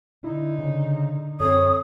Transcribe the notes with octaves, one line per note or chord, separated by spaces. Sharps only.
D3 D#4 E4
C#3
F#2 C4 A4 C#5 D#6